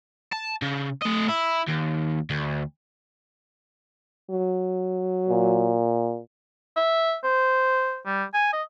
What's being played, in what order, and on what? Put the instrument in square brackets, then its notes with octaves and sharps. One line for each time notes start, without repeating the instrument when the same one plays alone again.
[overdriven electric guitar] A5
C#3
A3 D#5
E4
D#2
D2
[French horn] F#3
[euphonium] A#2
[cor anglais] E5
C5
G3
G#5
D#5